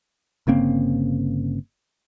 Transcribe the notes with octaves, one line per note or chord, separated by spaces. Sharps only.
G1 C#3 A#3 C4